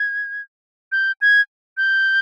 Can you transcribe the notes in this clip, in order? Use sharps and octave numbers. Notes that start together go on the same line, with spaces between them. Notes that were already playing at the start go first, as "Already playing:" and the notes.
Already playing: G#6
G6
G#6
G6